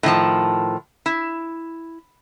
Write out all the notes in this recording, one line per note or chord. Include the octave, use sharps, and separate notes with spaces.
A2 D#3 F3 A5
E4